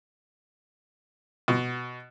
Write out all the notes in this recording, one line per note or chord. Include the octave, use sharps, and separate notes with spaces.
B2